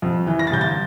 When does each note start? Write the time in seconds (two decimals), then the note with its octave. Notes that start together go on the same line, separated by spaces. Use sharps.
0.02 F2
0.27 E3
0.39 A#6
0.47 A6
0.52 G1 G6
0.61 A6